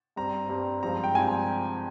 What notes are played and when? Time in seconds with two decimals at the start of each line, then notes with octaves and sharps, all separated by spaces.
0.16 G2 G3 C4 A#5
0.49 G2 G3 C4
0.83 G2 F3 G#3 C4 A#5
1.04 G5
1.15 G2 F3 G#3 C4 G#5